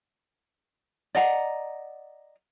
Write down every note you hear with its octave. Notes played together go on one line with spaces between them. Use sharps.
D5 D#5 F#5 A#5